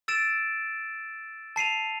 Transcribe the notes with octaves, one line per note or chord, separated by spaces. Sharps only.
E6 A6 D7 E7
A5 C7 D#7 F7